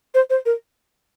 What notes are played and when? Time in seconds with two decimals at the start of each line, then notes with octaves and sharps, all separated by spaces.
0.15 C5
0.30 C5
0.46 A#4